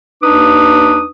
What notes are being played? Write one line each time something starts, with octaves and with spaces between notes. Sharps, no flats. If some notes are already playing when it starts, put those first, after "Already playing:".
D#2 D4 D#4 B4 D6 D#6